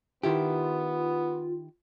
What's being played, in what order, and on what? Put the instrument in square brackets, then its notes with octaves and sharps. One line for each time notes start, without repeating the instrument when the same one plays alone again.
[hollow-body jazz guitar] D#3 E4 G4 [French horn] B3 [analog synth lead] F4